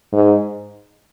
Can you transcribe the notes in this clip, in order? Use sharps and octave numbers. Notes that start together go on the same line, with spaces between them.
G#2